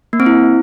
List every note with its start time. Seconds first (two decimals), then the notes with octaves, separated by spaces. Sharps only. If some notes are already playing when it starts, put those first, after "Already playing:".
0.13 A#3
0.20 C4
0.26 E4